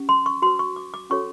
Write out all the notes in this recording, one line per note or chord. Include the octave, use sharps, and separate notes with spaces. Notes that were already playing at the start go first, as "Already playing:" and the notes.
Already playing: C#4 G4
C6
C#6
F#4 B4 C6
C#6
D6
D6
C#4 F#4 A4 C#5 C#6